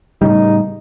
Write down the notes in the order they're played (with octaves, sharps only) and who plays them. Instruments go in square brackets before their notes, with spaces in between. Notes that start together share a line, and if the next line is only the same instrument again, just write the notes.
[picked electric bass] A2 C#3 G3 [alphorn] D#4